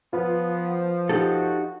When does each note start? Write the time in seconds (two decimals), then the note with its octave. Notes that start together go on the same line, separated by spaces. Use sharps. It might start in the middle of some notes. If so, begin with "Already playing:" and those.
0.13 F3 B3 F4 B4
1.09 D#4 F#4 G4 A4